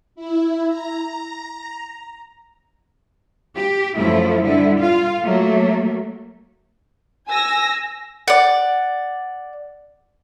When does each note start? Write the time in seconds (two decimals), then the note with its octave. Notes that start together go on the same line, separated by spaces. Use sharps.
0.15 E4
0.68 A#5
3.55 G4
3.94 F#2 F3 A3 E4
4.43 D3 G3 E4
4.77 F4 F5
5.21 F#3 A3 A#3
7.28 G#5 E6 A#6
8.28 D5 F#5